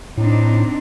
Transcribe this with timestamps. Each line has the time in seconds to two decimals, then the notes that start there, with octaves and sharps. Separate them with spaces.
0.17 A2 C4 D4 D#4